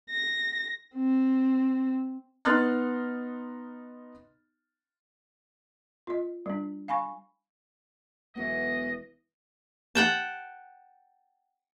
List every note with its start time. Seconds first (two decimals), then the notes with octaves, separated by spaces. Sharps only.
0.11 A#6
0.96 C4
2.45 B3 D#4 C6 F6 F#6 A6
6.07 F4 D#5
6.46 G3 D4
6.88 F5 G#5 B5 C#6
8.35 E1 E3 F#3 B3 D#5
9.95 F#5 G5 A5